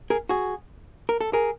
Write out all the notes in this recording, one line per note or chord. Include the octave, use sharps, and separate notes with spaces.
G#4 A#4
F#4 G#4
A#4
A4
G#4 A#4